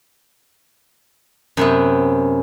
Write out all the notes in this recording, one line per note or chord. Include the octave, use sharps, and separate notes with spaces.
F#2 C3 B3